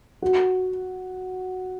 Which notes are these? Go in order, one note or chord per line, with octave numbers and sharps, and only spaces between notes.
F#4